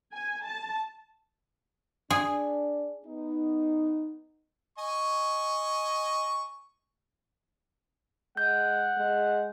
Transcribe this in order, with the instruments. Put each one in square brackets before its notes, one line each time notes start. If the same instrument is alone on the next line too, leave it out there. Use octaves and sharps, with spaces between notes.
[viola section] G#5
A5
[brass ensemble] D4 [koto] G#4
[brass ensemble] B3 D#4
[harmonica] D#5 G#5 C#6
[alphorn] G#3 [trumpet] F#5 [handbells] G6
[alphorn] G#3